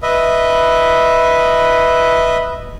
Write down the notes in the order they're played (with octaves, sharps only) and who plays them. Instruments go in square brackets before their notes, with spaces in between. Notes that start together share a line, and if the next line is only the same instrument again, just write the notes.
[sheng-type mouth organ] B4 D#5 E5